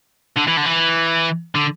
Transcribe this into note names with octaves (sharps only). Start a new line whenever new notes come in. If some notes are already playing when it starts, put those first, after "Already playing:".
D3
E3
D3
E3
D3